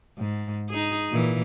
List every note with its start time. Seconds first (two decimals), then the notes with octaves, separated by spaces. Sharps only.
0.18 G#2
0.70 D#4 G#4
1.10 A#2 E3